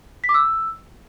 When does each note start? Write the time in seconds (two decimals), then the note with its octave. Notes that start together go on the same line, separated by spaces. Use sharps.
0.24 B6
0.29 D6
0.34 E6